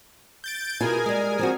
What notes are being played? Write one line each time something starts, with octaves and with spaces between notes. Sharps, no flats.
G6 A6 D7
B2 E4 F4 G#4 A#4 G#5
G3 G#3
F3 C4 F#4